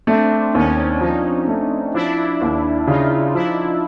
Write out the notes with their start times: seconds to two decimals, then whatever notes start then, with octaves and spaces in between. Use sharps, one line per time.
0.07 A3 C4 D4
0.54 D#2 C#4 D#4
1.01 F3 C#4 D#4
1.47 A3
1.94 F3 D4 E4
2.41 D#2
2.87 C#3 D#4 F4
3.34 F3 D4 E4